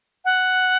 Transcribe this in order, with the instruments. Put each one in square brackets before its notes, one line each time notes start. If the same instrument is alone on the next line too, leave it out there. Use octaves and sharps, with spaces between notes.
[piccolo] F#5